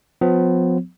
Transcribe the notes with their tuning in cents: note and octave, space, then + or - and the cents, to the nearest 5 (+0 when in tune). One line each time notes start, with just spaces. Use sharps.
F3 +35 B3 +35